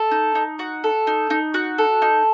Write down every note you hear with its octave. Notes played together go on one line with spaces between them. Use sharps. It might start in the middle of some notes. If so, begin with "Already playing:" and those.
Already playing: A4
D#4
D#4
F#4
A4
D#4
D#4
F#4
A4
D#4